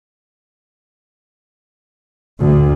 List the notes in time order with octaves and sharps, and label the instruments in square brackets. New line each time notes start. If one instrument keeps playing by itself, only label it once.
[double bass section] D2